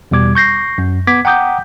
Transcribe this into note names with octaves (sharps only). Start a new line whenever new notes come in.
E2 B2 G3 D6 G#6
C#6 G6 A#6 C7
F#2
B3 D6 G#6 B6
F#5 G5 A#5 D6 D#6 G6